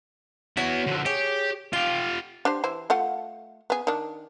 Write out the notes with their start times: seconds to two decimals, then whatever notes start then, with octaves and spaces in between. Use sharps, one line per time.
0.57 B3 E4 F#4 C#5 F#5
0.87 D3 F3
1.06 G4 G#4 C#5
1.73 F4 G4 F5
2.45 D4 G4 C5
2.64 E3 E4 C5
2.90 A3 F4 F#5
3.70 B3 G#4
3.87 D#3 D4